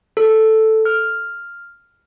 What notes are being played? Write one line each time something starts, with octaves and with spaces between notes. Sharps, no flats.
A4
F6